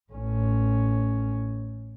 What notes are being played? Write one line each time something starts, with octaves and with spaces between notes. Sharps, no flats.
A1 C#4